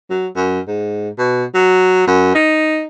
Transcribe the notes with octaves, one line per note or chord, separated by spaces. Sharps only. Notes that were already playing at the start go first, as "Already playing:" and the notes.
F#3
F#2
G#2
B2
F#3
F#2
D#4